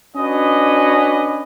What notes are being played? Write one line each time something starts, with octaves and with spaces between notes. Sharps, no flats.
C#4 D4 F#4 B4 D#5